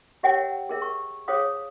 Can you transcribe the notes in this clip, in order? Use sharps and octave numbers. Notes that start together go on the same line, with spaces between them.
G4 A#4 C#5 E5 F#5 G5
G#4 A#4 E5
C#6
G#4 C5 C#5 F5 D#6